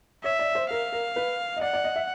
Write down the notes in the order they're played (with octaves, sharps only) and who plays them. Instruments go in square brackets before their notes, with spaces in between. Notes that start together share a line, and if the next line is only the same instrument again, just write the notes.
[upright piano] C#5 [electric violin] E5
[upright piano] D5
C5
[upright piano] A#4 [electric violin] F5
[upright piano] A#4
B4
D#5
[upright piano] D5 [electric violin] F#5
[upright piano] D5
D#5
E5